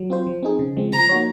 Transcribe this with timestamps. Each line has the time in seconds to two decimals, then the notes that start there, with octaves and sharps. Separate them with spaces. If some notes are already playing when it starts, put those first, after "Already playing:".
Already playing: F#3
0.10 C4 F4 C5
0.27 F3
0.43 C4 D#4 G#4
0.59 C#3
0.77 F3 G#3 C4
0.92 F3 A#5
1.09 A#3 D#4 F#4 C#5